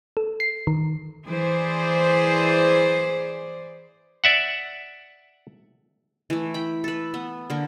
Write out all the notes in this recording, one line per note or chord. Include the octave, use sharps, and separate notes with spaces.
A4
C7
D#3
E3 G#4 C5 D5
D5 E5 F#5
E3 A3
G5 B5
A4 B4
B3
D3 A#3